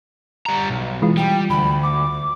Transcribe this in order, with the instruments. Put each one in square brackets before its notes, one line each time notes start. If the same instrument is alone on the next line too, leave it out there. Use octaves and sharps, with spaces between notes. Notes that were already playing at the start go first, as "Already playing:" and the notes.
[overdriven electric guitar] G3 A#5
B1
[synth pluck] E3 G#3 F4
[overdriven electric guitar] G3 [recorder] G5
[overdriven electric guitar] D2 [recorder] B5
[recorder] D6